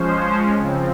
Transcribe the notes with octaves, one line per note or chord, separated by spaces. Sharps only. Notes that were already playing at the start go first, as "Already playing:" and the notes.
Already playing: F3 G#3 C#4 C5
C#3 F3 C4